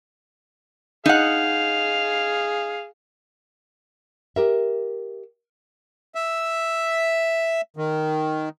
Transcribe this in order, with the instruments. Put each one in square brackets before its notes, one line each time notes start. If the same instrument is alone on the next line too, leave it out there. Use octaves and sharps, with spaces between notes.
[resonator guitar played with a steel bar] D#4 F#5 [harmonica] G#4 F5
[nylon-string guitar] G4 A#4 E5
[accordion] E5
D#3